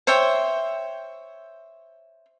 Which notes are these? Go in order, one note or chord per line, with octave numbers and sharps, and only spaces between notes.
C5 C#5 E5 G5